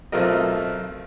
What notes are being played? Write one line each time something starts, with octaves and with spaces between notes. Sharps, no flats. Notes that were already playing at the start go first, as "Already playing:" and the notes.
B1 A3 C4 F4 A#4 D#5